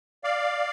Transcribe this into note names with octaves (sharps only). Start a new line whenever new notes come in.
D5 F5